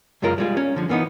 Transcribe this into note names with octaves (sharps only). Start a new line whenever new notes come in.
C#2 F#2 G#3 F4 A#4
G3 G#3 F4
C#4
D3 F3
E3 A#3 B3 D4 D#4